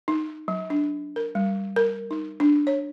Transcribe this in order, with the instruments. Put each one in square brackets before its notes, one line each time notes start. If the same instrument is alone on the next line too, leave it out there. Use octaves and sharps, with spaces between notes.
[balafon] D#4
F#3
D4
A#4
G3
A#4
D#4
D4
C#5